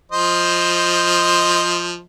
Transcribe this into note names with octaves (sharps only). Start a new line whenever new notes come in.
F3 C5 D#5